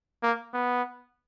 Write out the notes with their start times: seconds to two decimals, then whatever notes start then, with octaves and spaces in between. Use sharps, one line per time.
0.23 A#3
0.54 B3